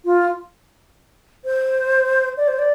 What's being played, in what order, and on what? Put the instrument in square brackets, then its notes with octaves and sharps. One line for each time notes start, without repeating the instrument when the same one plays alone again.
[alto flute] F4
C5
D5
C5
D5